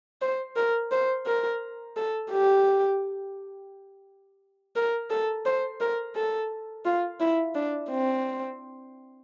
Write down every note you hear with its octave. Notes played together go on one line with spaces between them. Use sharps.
C5
A#4
C5
A#4
A4
G4
A#4
A4
C5
A#4
A4
F4
E4
D4
C4